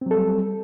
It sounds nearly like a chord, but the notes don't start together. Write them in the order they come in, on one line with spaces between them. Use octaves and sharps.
C4 F#3 A4 G3